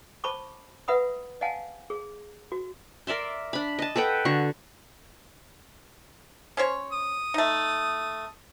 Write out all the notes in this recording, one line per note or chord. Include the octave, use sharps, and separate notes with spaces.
C5 A5 B5 C#6 D6
B4 E5 F#5 B5 D#6
D#5 F5 F#5 G#5 A5
G#4
F#4
A#4 D5 E5 C6
D4 B5
D#5 A5
A4 B4 F#5 G5
D3 F#4 C#6
C#4 C5 C#5
D#6
A3 D#4